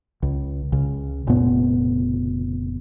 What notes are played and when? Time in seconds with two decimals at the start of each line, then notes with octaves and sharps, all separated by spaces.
0.22 C#2
0.72 C#2 C#3
1.27 F1 A#2 C#3 B3